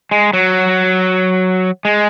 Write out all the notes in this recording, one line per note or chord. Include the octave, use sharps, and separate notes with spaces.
G#3
F#3
G#3